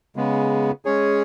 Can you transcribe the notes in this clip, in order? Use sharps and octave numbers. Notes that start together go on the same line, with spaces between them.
C#3 G#3 B3
G#3 C#4 G#4 C#5